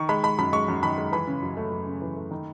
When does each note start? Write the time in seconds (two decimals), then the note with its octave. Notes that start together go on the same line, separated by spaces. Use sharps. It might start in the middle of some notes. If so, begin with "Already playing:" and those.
Already playing: D#3 C#6
0.09 G#3 B5
0.23 G#3 B5
0.38 F#2 B5
0.53 G#3 C#6
0.68 F#2
0.83 D#3 B5
0.98 G#3
1.12 E3 B5
1.27 C#3
1.43 F#2
1.57 A3
1.72 F#2
1.87 C#3
2.02 E3
2.17 A3
2.31 D#3